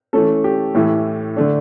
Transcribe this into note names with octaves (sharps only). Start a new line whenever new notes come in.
E3 A3 C#4 A4
G4
A2 E3 A3
D3 A3 D4